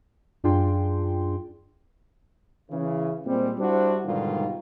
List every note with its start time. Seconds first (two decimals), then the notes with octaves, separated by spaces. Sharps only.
0.44 F#2 D4 F4 G#4 G5 C6
2.70 C#3 E3
3.25 A#2 G3 G#3 C4
3.59 G3 D4 E4 F#4 C5
4.05 G#2 B2 D3 D#3 G3 F4